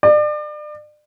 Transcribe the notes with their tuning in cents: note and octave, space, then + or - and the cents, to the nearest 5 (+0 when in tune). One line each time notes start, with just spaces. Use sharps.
D5 +35